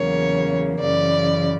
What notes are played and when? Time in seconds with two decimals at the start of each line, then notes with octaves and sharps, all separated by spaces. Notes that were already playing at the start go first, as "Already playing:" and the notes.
Already playing: E2 C#3 F#3 A#3 C#5
0.81 F#2 C#3 E3 D5